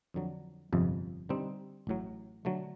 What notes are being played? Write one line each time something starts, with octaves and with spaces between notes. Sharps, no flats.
F2 D3 F#3
G1 F2 C3 F3 G#3
D3 G3 C4 D#4
A1 A2 F#3
D3 F#3 A3